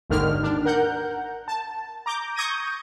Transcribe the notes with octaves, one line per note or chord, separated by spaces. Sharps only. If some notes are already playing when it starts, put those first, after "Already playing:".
G#1 D#2 D3 D#3 F6
D4
A#4 F#5 G6
A5
A#5 D6 G6
C#6 D#6 G6 G#6 A#6 D#7